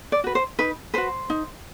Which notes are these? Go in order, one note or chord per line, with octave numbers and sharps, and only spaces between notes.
D5
F#4 B4
C5
D#4 B4
F#4 B4 C5
D#4